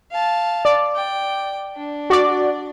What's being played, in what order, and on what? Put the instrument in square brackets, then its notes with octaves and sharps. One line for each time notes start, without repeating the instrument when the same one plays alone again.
[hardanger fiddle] F5 A5
[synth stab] D5
[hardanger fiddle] G5
D4
[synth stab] F#4 D5